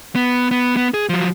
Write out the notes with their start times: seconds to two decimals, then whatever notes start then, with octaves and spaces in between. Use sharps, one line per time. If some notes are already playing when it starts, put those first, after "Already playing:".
0.16 B3
0.51 B3
0.77 B3
0.94 G#4
1.09 F3 F#3